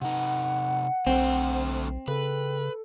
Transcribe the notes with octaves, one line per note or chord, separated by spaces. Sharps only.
C3 D#4 F#5
B1 D3 A3 C4 C5
C#3 A4 B4